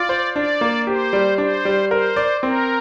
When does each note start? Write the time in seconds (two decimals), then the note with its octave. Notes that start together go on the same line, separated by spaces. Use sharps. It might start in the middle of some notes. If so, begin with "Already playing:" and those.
Already playing: F4 D5
0.09 C5
0.35 D4 D5
0.61 A#3
0.87 G4 C5
1.13 G3
1.38 D4 C5
1.65 G3
1.90 A#4 C5
2.16 D5
2.43 C4 A#4